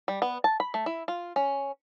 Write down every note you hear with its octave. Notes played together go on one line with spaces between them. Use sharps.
G3
B3
A5
B5
A3
E4
F4
C#4